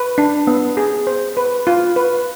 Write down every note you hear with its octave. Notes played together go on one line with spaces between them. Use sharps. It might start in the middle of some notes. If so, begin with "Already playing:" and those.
Already playing: B4
D4
B3
G#4
C5
B4
F4
B4